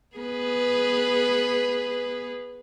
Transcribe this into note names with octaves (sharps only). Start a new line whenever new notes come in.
B3 G#4 B4